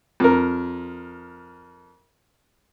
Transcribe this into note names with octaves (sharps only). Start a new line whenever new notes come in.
F2 A#4